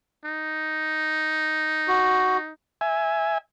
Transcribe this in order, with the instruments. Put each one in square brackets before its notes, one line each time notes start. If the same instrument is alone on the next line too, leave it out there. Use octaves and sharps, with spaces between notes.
[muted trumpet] D#4
[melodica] F#4
[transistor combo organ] E5 G#5